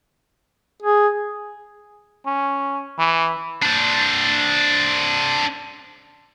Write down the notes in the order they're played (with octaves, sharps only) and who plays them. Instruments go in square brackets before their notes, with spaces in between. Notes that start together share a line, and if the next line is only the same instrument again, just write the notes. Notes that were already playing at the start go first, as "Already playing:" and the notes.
[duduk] G#4
[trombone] C#4
E3
[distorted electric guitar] D4 C5